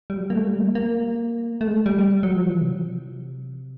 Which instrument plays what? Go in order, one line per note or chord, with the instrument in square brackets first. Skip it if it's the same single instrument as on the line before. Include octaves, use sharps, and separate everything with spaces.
[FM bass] G3
F#3
G3
A#3
A3
G3
A#3
A#3
A3
G#3
A3
G3
G3
F#3
F3
E3
C3